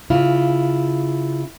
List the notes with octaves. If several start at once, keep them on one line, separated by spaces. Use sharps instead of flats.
C#3 E4 F4